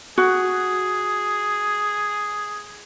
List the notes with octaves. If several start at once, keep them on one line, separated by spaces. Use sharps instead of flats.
F#4 G#4